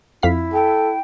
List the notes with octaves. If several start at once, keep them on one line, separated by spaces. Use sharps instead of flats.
F2 E4 F5 B6
A4 G5